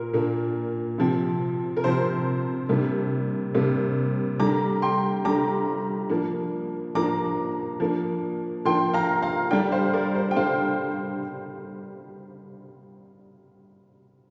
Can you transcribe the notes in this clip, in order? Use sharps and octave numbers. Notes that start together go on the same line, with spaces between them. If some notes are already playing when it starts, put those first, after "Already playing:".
Already playing: A#2 A#3 A#4
A#2 A#3 D4
C3 F3 C4
A#4
C3 F3 C4 C5
C3 G3 A#3 D4
C3 G3 A#3 D4
D3 G3 D4 A#5 D6
G5 C6
D3 G3 D4 A#5 D6
F3 A#3 D4
F3 A#3 D4 A#5 D6
F3 A#3 D4
F3 A#3 D4 G5 C6
F5 A#5
F5 A#5
D3 G3 D4 D5 G5
C5 F5
A#4 D5
C5
G5
D3 G3 D4 C5 F5